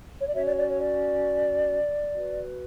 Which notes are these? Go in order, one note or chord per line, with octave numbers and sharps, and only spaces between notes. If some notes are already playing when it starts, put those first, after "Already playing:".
C#5
D5
C#4 F#4 C#5 E5
D5
D5
C#5
D5
F#4 B4